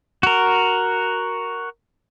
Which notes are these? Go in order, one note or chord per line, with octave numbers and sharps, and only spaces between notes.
F#4 A#4